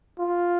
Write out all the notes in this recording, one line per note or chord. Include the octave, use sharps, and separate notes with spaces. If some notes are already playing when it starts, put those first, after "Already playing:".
F4